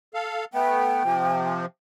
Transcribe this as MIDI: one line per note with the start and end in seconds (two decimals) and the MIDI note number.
0.14 0.45 69
0.14 0.45 77
0.54 1.03 57
0.54 1.03 59
0.54 1.49 79
1.04 1.66 48
1.04 1.66 53